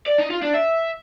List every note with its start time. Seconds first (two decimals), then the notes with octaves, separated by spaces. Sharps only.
0.06 D5
0.18 D#4
0.30 F4
0.42 D4
0.54 E5